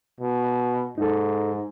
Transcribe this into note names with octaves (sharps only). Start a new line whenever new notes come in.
B2
G#2 D#4 A4